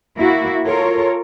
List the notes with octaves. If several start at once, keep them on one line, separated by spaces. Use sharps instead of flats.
A#3 E4 F#4
F4 A4 A#4 C#5